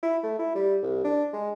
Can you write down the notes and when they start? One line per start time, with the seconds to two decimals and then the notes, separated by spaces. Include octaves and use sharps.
0.03 E4
0.23 A3
0.39 E4
0.55 G3
0.82 C2
1.04 D4
1.33 G#3